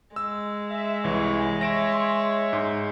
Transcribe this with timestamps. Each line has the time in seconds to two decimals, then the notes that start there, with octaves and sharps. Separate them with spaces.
0.16 G#3 E6
0.71 E5
1.04 C2 E3 C#5
1.61 C#5 E5 A#6 D7 E7
1.92 C6
2.53 G#2